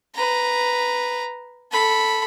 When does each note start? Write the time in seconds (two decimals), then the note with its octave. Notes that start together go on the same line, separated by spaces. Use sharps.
0.15 B4 A#5
1.71 A4 B5